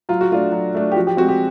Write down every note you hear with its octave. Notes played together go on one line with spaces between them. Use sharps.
F#3 F4
F#4
A3 D4 F4
F#3
A3 D4
G4
F3 F#4
G4
G#3 C4 F#4
G4